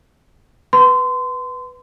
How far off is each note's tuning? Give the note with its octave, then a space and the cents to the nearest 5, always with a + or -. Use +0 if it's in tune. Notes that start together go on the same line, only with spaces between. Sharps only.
B4 +0 C6 -25